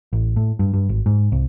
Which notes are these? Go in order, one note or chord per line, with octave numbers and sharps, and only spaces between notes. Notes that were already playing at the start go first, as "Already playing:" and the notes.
A1
A2
G2
G2
G#1
G#2
C2